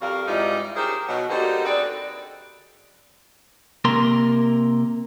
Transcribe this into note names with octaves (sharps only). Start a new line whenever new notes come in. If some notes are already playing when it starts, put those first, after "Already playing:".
F2 G3 F#4 A#4 F5
G#2 E3 G3 D#4 F4
D#4 G4 G#4 A#4 C5 C#5
B2 F#3 D#4
D3 G3 A#3 D#4 F#4 C5
C4 G#4 A4 B4 D5
C3 A#3 A#4 C6